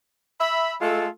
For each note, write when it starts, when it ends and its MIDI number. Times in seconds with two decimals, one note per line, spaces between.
0.40 0.73 76
0.40 0.73 83
0.81 1.07 56
0.81 1.07 57
0.81 1.07 65
0.81 1.07 69